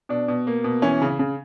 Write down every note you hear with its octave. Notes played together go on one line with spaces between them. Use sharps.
B2 D4
B2
A#3
B2
E3 C#4
C#3
C#3